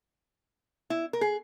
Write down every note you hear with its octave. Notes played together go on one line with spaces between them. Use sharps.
E4
A#4
G#4